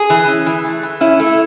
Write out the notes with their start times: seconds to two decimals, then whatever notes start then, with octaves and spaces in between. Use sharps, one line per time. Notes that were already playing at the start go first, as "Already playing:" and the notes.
Already playing: G#4
0.10 E3
0.28 C#4
0.47 E3
0.65 A3
0.83 E3
1.01 C#4 E4
1.20 A3